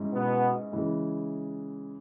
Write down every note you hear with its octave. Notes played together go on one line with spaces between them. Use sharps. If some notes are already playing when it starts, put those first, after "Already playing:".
Already playing: G#2 G#3 C#4 E4
B2 B3
C#3 E3 G#3